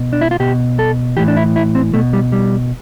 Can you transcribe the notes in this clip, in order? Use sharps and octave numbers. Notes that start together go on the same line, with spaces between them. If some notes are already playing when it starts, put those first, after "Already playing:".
Already playing: B2
D4
E4
F4
B2 G4
A4
A2 E3 G4
D4
E4
E4
C4
B2 A3
G3
G3